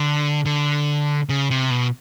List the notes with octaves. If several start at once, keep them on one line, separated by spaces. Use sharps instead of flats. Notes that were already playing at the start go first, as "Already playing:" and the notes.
Already playing: D3
D3
C#3
C3
B2